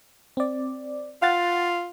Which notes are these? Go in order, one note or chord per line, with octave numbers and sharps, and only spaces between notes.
C4 D5
F4 F5 F#5 A6